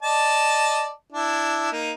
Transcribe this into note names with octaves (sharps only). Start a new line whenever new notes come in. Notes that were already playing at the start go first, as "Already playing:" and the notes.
D5 D#5 A5
D4 E4
A#3 D#4